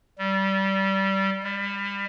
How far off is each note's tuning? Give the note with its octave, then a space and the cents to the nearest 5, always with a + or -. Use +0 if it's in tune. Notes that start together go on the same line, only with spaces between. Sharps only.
G3 -20
G3 +30